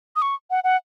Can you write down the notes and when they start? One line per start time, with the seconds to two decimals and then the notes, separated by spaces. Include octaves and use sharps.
0.16 D#6
0.22 C#6
0.51 F#5
0.64 F#5